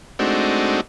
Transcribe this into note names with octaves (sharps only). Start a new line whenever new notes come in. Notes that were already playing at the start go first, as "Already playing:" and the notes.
G#3 A3 C4 D4 D#4 F#4